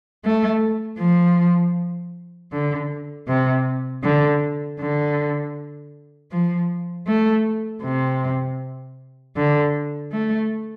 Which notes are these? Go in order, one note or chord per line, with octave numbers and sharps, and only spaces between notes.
A3
F3
D3
C3
D3
D3
F3
A3
C3
D3
A3